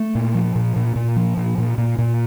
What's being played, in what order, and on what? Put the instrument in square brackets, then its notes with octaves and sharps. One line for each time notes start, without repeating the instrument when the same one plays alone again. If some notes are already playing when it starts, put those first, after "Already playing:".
Already playing: [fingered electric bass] A3
A#2
F3
A#2
A#2
A#2
F3
A#2
A#2
A#2
A#2